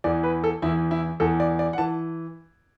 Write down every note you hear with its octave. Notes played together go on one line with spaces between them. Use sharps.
E2 E3 D5
B4
A4
E2 E3 E4
E4
E2 E3 A4
D5
D5
F#5
E3 A5